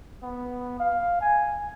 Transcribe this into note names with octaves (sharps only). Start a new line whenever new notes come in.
B3
F5
G#5